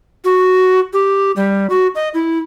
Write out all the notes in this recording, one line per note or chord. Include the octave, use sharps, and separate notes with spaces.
F#4
G4
G3
F#4
D#5
E4